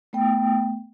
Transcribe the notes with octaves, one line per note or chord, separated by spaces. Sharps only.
A3 B3 G5